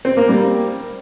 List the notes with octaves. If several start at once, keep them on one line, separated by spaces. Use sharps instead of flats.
C4
A#3
G3